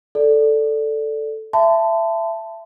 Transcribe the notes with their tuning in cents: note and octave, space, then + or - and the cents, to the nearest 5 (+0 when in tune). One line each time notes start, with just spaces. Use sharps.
A4 +0 D5 -5
E5 +20 A5 +0 C6 -40